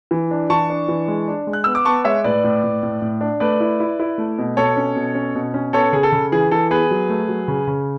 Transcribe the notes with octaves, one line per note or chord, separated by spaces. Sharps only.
E3
D4
E3 A5 C#6
D4
E3
G#3
D4
G#3
F#6
B3 E6
D6
B3 A5 C#6
G#3 C#5 E5
A2 B4 D5
A2
A2
A2
A2
D4
A3 B4 D5
E4
E4
E4
A3
B2
B2 A4 C#5
C#4
B2
C#4
B2
C#4
B3 A4 C#5
C#3 G#4
A4
C#3
E3 G#4
E3 A4
B3 G#4 B4
F#3
A3
F#3
C#3
C#3